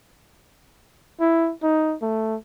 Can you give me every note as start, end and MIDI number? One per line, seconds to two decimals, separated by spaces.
1.20 1.53 64
1.63 1.95 63
2.02 2.37 57